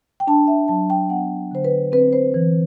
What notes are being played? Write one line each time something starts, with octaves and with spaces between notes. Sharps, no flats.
G5
D4 A5
E5
F#3 A5
G5
B3 F#5
D3 C5
B4
C4 B4
C5
E3